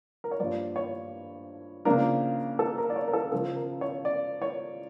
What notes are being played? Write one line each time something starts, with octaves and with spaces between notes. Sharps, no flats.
A#4
C#5
G2 F3 A#3 D5
C#5
C#3 F3 A#3 D4 A#4
A4
A#4
D5
C#5
A#4
A4
C#3 F3 C#4 A4
A#4
C#5
D5
C#5